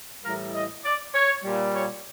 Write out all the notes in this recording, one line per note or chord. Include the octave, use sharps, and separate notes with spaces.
A2 E3 G3 A#4
D#5
D5
C#5
A#2 G3
C#5